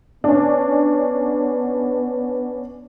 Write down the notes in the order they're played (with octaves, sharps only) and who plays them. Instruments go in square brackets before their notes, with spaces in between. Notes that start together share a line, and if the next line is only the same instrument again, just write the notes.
[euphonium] B3 [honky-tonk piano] C#4 D4